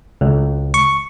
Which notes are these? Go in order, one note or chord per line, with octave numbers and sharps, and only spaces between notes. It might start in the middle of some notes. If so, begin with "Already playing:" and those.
C#2
C#6